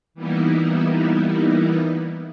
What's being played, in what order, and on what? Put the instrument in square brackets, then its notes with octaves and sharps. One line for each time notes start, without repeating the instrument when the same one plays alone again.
[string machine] E3 G3 A#3 B3 D#4 E4